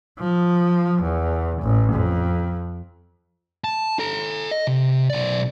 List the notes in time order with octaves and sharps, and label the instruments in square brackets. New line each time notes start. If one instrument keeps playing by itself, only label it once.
[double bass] F3
E2
A1
F2
[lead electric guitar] A5
A4 A#5
D#5
C3
B1 D5